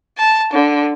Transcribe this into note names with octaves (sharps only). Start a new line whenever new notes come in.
A5
D3